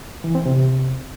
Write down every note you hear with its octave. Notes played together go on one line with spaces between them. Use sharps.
E3
C4
C3